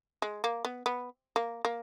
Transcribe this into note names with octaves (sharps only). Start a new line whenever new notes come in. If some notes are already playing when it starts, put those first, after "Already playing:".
G#3
A#3
B3
B3
A#3
A#3